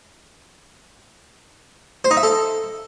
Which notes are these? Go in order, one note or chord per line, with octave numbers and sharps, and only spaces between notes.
C5
D#4
E5
A4